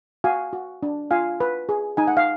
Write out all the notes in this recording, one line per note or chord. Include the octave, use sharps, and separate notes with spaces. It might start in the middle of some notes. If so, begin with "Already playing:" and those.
F#4 F5 G#5
F#4
D4
F4 F5 G#5
B4
G#4
D#4 G#5
F#5
F5